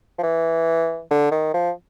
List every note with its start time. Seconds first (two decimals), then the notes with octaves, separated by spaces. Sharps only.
0.18 F3
0.23 E3
1.11 D3
1.31 D#3
1.54 F3